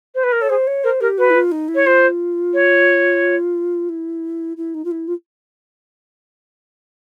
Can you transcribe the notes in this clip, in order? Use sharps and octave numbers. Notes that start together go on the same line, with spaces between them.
C5
B4
A#4
A4 C#5
G#4 C5
C#5
A#4 C5
G4 A#4
F#4 B4
E4
F4
D#4
E4
C#5
F4 C5
C#5
E4
E4
D#4
F4
E4
F4